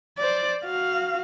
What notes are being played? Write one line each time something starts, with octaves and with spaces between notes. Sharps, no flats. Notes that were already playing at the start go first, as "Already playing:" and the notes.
C5 D5
F#4 F5